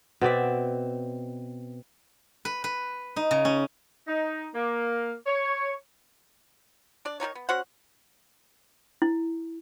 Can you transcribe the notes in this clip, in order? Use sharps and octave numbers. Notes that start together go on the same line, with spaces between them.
B2 C4 D5 E5
B4
B4
D#4
C#3
C#4
D#4
A#3
C#5
D4 D5
D#3 G3 D#4 C#5
B3
C#4 F#4 C5 F#5
E4